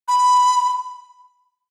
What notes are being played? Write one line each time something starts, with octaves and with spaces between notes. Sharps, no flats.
B5